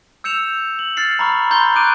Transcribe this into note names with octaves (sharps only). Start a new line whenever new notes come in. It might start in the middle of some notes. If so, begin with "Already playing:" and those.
E6 G6 C#7 E7 F7
F#7
F6 A6 C7 C#7
A#5 B5 C#6 F6
A#5 C6 G6 F7 G7
C#6 D6 F#6 D7 D#7